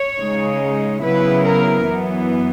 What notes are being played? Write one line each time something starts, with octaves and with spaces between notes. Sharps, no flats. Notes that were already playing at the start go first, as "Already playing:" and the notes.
Already playing: C#5
C#3 G#3 D#4
C#3 F#3 B3 E4 B4
A#4
F#2 E3 B3